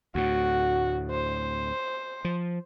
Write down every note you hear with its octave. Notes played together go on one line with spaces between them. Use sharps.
D2 A2 F#4
C5
F3